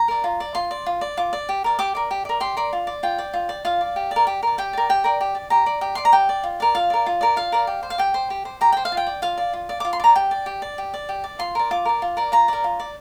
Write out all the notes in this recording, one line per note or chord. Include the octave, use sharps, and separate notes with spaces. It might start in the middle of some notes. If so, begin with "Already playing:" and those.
Already playing: A#5
A#4 D5
F4
D5
F4 C6
D5
F4
D5
F4 D6
D5
G4
A#4 D5
G4 D6
A#4 D5
G4
A#4 D5
G4 C6
A#4 D5
F4
D5
F4 G5
D5
F4
D5
F4 F5
D5
G4
D5
A#4
G4
A#4 D5
G4 G5
A#4 D5
G4 G5
A#4 D5
G4
D5
G4 A#5
D5
G4
D5 C6
A#5
G4 G5
D5
F4
A#4 D5
F4 F5
A#4 D5
F4
A#4 D5
F4 F5
A#4 D5
G4
C5
F5
G4 G5
C5
G4
C5
G4 A#5
C5 G5
F5
F4
G5
D5
F4 F5
D5
F4
D5
F4 D6
C6
D5 A#5
G4 G5
D5
G4
D5
G4
D5
G4
D5
F4 C6
A#4 D5
F4 D6
A#4 D5
F4
A#4 D5
F4 A#5
A#4 D5
F4
D5